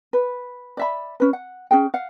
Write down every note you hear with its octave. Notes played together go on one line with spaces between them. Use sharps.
B4
D5 E5 B5
C#4 B4
F#5
C#4 G#4 G5
F5 F#5